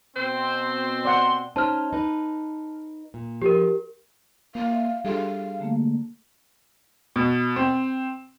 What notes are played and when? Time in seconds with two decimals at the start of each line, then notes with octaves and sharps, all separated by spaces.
0.16 B2 C4 C5
1.05 D5 F#5 C6
1.56 C#4 D#4 C5 A5 F6
1.93 D#4 B4
3.14 A#2
3.42 F3 G4 A#4
4.55 A#3 F5
4.71 E5
5.05 G3 D4 G#4 A4 F5
5.60 D3 A3 A#3
7.16 B2
7.56 C4